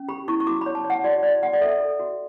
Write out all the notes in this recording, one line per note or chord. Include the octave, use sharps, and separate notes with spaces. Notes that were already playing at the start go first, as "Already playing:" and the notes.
Already playing: C#4
G4 B5
E4 C#6
C#6
F#4 D6
B5
C#5
A5
C#5
F#5
F#4 D5
F#4 D5
F#4 F#5
D5
A4 E5
A4
F#4